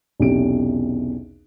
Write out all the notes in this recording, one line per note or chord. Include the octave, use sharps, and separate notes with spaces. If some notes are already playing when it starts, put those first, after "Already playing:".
B1 E2 C3 C#4 G4 D7